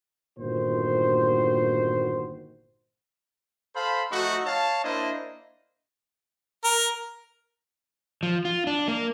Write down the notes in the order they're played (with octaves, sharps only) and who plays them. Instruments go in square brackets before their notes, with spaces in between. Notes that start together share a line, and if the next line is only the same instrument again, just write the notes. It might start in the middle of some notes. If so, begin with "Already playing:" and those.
[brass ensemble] G1 A#2 D#3 F#4 C5
[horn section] A4 C5 F5 B5
F3 A3 D#4 F#4
C#5 F5 A5
A#3 D4 E4 C5 D#5
[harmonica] A#4
[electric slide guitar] F3
F4
D4
A#3